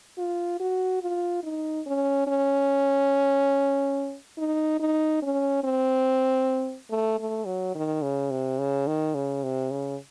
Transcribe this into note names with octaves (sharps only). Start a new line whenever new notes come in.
F4
F#4
F4
D#4
C#4
C#4
D#4
D#4
C#4
C4
A3
A3
F#3
D#3
C#3
C3
C#3
D#3
C#3
C3
C#3